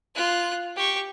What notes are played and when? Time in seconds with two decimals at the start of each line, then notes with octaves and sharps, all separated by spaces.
0.16 F4 F#6
0.76 G4 C#6